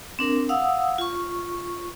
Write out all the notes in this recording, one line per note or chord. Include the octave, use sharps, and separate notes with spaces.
C4 D4 A#4
F5 F#5 D#6 E6
F4 C#6